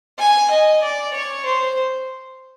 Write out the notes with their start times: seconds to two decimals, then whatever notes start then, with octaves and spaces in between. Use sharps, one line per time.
0.19 G#5
0.51 D#5
0.82 D5
1.14 C#5
1.46 C5